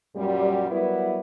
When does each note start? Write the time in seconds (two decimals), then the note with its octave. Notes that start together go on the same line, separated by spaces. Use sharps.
0.16 F#2 A#2 F#3 G3
0.69 F#3 G3 B3 E4 A#4 B4